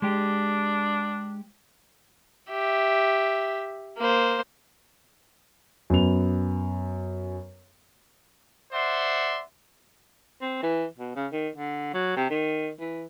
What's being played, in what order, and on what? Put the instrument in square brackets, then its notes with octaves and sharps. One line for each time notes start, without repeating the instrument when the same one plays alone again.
[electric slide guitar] G#3 G4 [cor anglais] D4
[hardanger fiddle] G4 E5
A#3 C5
[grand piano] F#2 B3 F7
[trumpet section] C5 D5 E5 F#5 C6
[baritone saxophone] C4
E3
B2
C#3
D#3
D3
F#3
C3
D#3
E3